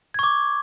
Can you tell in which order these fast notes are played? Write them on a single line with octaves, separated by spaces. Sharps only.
G#6 C#6 D6